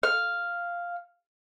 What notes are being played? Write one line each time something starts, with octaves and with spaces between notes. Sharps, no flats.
F5